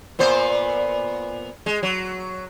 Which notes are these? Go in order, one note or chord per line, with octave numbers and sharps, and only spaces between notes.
A#2 B3 C5
G#3
F#3